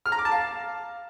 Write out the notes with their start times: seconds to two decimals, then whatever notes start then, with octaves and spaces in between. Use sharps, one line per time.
0.06 F6
0.12 A#5
0.19 D6
0.25 A5
0.32 F5